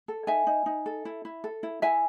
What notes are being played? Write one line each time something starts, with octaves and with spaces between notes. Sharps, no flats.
A4
D#4 E5 G#5
D#4
D#4
A4
E4
E4
A4
E4
E4 E5 G#5